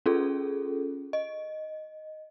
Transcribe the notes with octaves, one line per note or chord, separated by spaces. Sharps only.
C#4 F4 G#4 A4
D#5